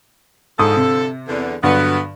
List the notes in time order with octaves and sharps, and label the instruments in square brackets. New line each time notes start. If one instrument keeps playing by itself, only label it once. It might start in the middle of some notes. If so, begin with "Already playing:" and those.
[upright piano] G#2 D#6 [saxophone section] D3 F3 A4
[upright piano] C3
[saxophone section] E2 D3
[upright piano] G2 D3 F#3 [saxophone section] B3